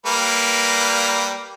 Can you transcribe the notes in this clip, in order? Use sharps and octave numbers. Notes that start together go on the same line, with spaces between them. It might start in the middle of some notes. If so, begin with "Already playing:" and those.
G3 A#3 B4